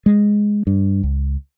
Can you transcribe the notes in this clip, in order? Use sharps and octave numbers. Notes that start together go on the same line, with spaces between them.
G#3
G2
C#2